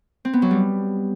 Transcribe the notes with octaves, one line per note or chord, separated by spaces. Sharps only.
C4
B3
F#3
G3